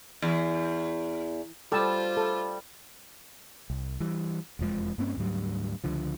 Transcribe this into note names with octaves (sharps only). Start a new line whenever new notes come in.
E2
G3 F4 A4 C5 A5 E6
A4
C2
E3 G3
E1 F2 F3 G#3
G2 A#3 C4 C#4
D2 G#2 F#3 G3
C#2 D3 F3